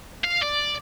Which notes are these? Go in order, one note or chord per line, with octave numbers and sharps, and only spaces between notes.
F5
D5